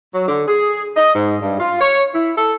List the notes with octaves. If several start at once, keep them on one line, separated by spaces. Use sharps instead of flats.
F#3
D3
G#4
D#5
G#2
G2
F4
C#5
E4
A4